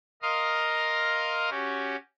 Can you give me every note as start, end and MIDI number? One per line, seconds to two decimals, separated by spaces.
0.22 1.50 70
0.22 1.50 75
0.22 1.50 77
0.22 1.50 82
0.22 1.50 84
0.22 1.50 87
1.50 1.96 61
1.50 1.96 66
1.50 1.96 67